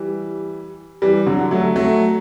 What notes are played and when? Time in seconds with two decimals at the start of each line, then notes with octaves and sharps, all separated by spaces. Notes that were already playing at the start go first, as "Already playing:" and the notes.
Already playing: E3 G3
1.02 E3 G3
1.27 D3 F#3
1.51 F#3 A3
1.76 F#3 A3